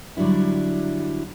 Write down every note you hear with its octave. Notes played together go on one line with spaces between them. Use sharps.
D3 F#3 G3 D4 E4